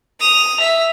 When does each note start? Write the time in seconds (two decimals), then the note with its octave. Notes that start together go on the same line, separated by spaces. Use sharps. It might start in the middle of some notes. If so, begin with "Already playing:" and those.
0.20 D#6 F7
0.60 E5